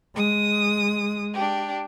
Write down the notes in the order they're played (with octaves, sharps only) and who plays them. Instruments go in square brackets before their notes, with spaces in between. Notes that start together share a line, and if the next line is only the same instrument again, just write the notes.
[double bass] G#3 [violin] D#6
[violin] D4 G4